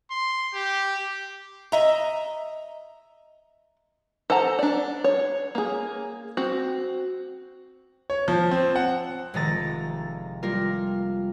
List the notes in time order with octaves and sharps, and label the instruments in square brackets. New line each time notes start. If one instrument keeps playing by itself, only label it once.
[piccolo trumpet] C6
G4
[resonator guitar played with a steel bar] D#5 E5 A#5
[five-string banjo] A4 C5 F#5 A5 A#5
D4 D5
C#5
A#3 G#4
C4 F#4
[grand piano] C#5
F3
C4
F#5
[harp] F1 C3 D#3 G#3 A#5 A6
G3 A#3 F4 A#4